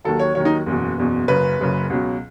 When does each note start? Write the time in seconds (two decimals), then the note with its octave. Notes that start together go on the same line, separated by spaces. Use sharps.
0.04 D#2 D#3 F#3 A4
0.19 C#5
0.35 D#2 D#3 F#3 C#5
0.45 D#4
0.66 F#1 E2 B2
0.98 F#1 E2 B2
1.28 F#1 F#2 C#3 B4
1.59 F#1 F#2 C#3
1.90 C#2 B2 F#3